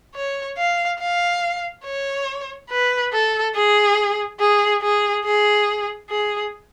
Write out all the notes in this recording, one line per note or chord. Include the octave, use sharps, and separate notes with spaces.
C#5
F5
F5
C#5
B4
A4
G#4
G#4
G#4
G#4
G#4